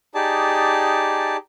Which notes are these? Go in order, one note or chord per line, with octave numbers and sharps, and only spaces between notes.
D#4 G4 G#4 D5 A5